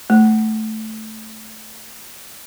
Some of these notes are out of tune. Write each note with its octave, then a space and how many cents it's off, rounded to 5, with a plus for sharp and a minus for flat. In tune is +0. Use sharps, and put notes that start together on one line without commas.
A3 -5